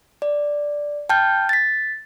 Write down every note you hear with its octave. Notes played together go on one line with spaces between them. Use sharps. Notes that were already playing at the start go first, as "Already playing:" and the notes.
D5
G5 A5 F6 G6
A6 B6